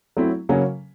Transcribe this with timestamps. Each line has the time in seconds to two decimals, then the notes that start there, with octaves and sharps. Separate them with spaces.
0.17 F#3 A3 C4 E4
0.49 C#3 F#3 A#3 C#4 F#4